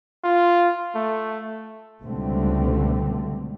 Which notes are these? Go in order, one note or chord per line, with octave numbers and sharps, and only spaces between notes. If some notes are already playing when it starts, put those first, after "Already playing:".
F4
A3
C#2 B2 D3 G3 A3 C4